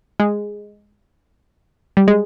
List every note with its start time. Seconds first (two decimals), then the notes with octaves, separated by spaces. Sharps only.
0.20 G#3
1.97 G3
2.08 G#3